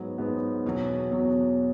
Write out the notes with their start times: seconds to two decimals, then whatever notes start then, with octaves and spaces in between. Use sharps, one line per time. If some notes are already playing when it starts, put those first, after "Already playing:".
Already playing: G#2 F#3 B3
0.18 G#2 F#3 B3
0.65 E2 B2 F#3
1.11 E2 B2 F#3